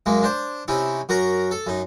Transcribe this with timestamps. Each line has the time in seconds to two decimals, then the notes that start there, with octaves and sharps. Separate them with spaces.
0.06 F#2 G#3 A#3
0.23 D4 C5
0.68 C3 C#4 D#4 E4
1.09 F#2 F#4 A#4 A#5
1.51 A4
1.67 F#2 D#4